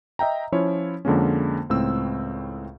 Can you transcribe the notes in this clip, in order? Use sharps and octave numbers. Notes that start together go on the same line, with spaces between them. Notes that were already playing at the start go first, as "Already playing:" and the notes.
D#5 E5 G5 A#5
F3 C#4 E4 F4 C#5
F2 D3 G#3 A#3 C#4
C#2 A2 C4 E6